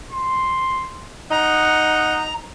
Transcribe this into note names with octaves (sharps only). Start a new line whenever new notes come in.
C6
D#4 F#5 A#5